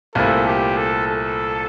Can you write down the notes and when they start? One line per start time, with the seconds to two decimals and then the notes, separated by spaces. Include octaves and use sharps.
0.15 C2 A#2 A3 C4 E4 A4
0.45 G4
0.77 A4
1.07 A4